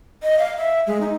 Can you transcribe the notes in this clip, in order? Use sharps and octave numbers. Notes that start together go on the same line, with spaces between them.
D#5
F5
E5
G#3
D#4